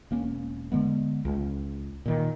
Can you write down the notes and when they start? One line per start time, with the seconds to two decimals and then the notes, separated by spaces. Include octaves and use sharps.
0.11 E1 A#3 C#4
0.72 D3 E3 G#3 B3
1.25 C#2
2.06 A#2 D#3